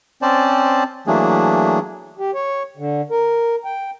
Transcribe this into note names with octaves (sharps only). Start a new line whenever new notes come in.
C4 C#4 C5 D5 A5
E3 F#3 A3 A#3 D4 G#4
G4
C#5
D3
A#4
G5